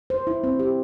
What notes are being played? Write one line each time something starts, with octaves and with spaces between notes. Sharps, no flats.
C5
E4
C4
G4